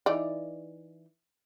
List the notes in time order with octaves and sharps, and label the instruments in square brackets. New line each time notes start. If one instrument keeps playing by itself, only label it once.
[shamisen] E3 D#4 D5